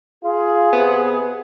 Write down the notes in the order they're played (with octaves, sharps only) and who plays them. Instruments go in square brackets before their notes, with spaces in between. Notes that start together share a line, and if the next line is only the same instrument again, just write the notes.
[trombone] F4 [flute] G#4
[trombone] C3 [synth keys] B3